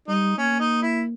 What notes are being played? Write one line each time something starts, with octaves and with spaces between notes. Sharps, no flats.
G3 D#4
A#3 C#4
D#4
E4